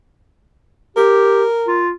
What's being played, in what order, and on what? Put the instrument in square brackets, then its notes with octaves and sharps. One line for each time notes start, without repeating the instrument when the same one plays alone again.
[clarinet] G4 [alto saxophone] A#4
[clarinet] F4